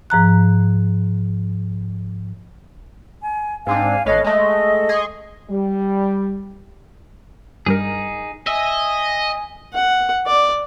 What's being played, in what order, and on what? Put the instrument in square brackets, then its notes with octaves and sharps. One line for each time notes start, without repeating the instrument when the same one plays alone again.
[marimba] G#2 F3 A#5 F#6
[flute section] G#5
[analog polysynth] G#2 C4 D4 [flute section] F5 G#5
[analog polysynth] A1 B4 F5 [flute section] A4 C#5 D#5
[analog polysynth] G#3 A3 [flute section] D#5
[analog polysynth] G#4 C6 C#6
[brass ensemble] G3
[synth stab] G2 G3 A#4 [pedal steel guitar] D#4 G#4
[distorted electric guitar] D#5 [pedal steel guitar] E5 [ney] G#5
[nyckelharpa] F#5
D5